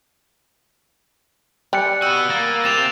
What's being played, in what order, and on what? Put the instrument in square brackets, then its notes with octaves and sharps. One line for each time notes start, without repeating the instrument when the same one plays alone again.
[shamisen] G3 [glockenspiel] G#5 F#6 C#7
[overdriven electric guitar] B3 F#4 [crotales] E6 G6 D#7
[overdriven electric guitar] A#3 [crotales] A6
[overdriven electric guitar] C4 G4 [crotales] A6 E7 F7